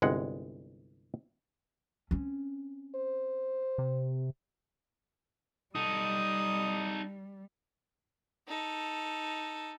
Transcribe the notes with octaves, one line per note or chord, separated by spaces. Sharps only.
G1 C2 G#3 F#5
C4 C#4
C5
C3
G3 D#4 A4 D#6
D#4 A4